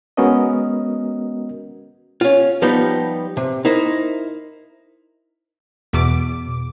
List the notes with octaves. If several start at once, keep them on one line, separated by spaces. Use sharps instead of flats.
G#3 B3 C#4 F#4 A#4 D#5
C#4 F4
F3 G3 B3 D#4 F4 G4
C3
D#4 E4 A#4 C5
E2 B2 D6